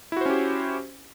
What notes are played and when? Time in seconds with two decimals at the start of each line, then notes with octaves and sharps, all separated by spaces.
0.12 E4
0.17 F#4
0.21 C5
0.26 C#4
0.30 G4